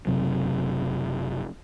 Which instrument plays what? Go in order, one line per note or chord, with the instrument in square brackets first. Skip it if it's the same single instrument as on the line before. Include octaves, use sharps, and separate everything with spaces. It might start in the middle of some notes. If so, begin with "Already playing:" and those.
[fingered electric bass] F#1 D#2 C3 F#3